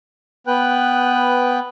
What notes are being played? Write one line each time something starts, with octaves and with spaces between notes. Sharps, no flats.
B3 B4 G5 F#6